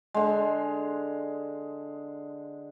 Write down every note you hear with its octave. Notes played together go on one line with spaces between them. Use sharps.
D3 G#3